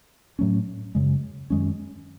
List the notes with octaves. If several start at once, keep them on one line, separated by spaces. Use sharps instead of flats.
A2 F#3 A3 C#4
F#2 C#3 G#3
F#2 D#3 G#3 C#4